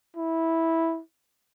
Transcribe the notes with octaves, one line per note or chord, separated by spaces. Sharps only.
E4